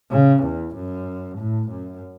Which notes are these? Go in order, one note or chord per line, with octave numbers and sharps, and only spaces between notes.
C#3
E2
F#2
A2
F#2